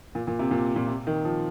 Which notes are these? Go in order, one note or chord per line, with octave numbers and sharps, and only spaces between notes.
A#2
A#2
C3
A#2
A#2
C3
D#3
F3